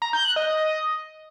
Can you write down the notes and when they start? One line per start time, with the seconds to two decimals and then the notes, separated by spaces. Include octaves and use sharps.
0.02 A#5
0.13 G6
0.25 F#6
0.36 D#5